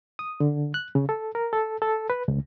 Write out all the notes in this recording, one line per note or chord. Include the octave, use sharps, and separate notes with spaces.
D#6
D3
F#6
C#3
A4
A#4
A4
A4
B4
C#2